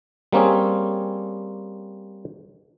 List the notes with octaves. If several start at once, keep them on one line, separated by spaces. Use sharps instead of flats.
G3 A#3 C4 C#4 G#4